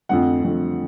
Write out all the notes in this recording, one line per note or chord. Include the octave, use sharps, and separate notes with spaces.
F2 D3 F3 A3 C4 F#5
F2 D3 F3 A3 C4